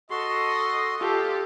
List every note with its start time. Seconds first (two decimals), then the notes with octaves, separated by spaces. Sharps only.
0.10 F#4 A4 D#5 C6
1.00 F4 G4 A4